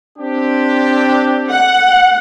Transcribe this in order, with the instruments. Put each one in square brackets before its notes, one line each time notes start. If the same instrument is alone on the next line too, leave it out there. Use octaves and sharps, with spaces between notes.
[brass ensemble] C4 D4 G4
[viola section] F#5